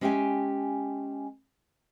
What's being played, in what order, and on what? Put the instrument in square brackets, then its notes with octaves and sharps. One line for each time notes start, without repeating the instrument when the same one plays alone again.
[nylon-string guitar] G#3 C#4 G4 E5 G5 G#5